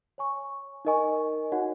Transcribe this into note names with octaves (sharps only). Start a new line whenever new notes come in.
C#5 G#5 C#6
D#4 A#4 D#5 G#5 C#6
D#4 F#4 C#5 F#5